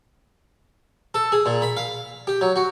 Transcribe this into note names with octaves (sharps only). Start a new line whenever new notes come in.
A4
G#4
A#2
B5
F5
G4
F#3
F#4